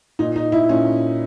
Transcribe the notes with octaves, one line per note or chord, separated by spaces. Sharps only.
A#2 D#4
D#4
E4
A#2 C#4